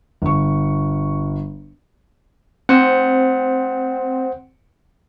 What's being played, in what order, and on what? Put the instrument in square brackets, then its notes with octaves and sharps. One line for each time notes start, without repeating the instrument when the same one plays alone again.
[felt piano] G1 C#6
[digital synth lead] C4 [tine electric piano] C5 F#5